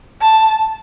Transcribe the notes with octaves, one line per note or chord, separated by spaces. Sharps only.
A5